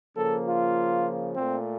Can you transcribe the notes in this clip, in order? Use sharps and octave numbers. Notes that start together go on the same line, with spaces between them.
C#3 F3 A#3 A4
F4
A#2 A3 C4